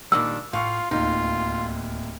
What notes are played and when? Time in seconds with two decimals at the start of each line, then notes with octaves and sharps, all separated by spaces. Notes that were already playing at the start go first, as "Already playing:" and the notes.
0.12 A#2 D#3 G3 D4 E6
0.53 A2 F4 F5 C#6
0.91 D1 D#2 D#4 F4